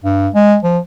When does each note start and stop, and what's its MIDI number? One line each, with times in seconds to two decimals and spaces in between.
0.04 0.28 43
0.34 0.56 56
0.63 0.79 53